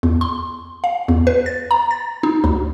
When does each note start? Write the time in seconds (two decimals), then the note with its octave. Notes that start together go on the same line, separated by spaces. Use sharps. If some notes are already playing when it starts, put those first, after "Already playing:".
0.03 E2
0.21 C6
0.84 F5
1.08 E2
1.27 B4
1.46 A6
1.71 A#5
1.91 A6
2.23 D#4
2.44 D2